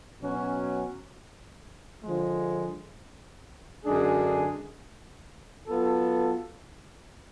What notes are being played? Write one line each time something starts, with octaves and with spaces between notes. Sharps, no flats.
B2 F#3 C#4
D3 F3 G#3
F#2 D3 G#3 D4 G#4
F#3 B3 F4 A4